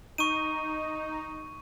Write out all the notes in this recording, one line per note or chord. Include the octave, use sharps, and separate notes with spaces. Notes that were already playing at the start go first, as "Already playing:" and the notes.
D#4 C#6 D#7